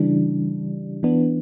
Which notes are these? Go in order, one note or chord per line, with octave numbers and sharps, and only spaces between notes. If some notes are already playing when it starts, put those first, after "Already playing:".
Already playing: C#3 E3 G3 D4
E3 B3 D4